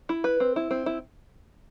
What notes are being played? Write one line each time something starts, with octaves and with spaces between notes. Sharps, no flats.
E4
B4
C4
E4
C4
E4